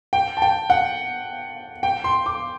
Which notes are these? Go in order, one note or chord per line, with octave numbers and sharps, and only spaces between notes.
G5
A5
G5
F#5
G5
C6
D6